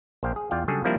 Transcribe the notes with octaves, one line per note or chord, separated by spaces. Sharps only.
A#1 C5 F5 G5
G#4
E2 F4 D5 F5 G5
C#3 F#3 G3 D4 G#4 A4
F3 G3 A#3 C4 D4 E4